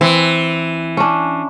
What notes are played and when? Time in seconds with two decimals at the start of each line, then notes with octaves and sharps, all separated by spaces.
0.01 E3 C4
0.97 C#4 D4